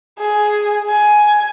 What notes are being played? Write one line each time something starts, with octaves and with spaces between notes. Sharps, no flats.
G#4
G#5